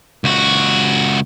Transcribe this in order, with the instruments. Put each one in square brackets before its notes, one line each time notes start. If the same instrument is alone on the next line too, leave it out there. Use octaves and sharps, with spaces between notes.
[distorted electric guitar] C#2 F#4